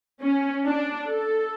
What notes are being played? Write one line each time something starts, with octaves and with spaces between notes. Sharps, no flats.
C#4
D4
A4